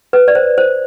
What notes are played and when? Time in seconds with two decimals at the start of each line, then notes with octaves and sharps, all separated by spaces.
0.13 B4
0.28 D5
0.35 C5
0.58 C5